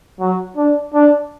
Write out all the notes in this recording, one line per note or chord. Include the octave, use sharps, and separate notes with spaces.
F#3
D4
D4